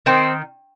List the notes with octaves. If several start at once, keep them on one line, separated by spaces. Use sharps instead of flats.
D#3 C4